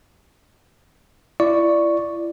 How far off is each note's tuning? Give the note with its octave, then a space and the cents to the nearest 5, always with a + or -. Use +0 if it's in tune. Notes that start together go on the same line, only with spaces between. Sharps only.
E4 +35 D5 +0 C#6 +0